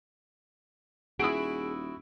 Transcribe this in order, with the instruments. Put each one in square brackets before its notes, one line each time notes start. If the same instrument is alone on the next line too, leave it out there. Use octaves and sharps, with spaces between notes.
[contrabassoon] D#1 [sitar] E4 F#4 [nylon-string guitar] G#4 [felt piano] D#6 E6 D7